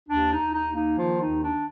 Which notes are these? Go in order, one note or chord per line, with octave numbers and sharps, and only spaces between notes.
D#2 D4
D#4
D#2
D#4
A#3
D#4
D#3 F3 F4
D#4
D#2
D4